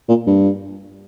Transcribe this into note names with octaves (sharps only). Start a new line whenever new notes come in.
A#2
G2